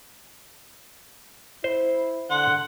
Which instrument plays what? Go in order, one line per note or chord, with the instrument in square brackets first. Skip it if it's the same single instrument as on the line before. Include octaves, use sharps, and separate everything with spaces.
[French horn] E4 [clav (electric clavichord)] C5
[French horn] D3 [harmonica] F#5 [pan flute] C6